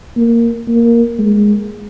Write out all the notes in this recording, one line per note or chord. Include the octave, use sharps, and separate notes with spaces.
A#3
A#3
G#3